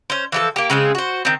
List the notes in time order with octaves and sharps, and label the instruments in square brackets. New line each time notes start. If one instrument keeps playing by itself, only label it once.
[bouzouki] C#4 C5
E3 F3 A4
A#3 G4
C#3 G#3 C4 G#4
F#4 C5
D#3 C4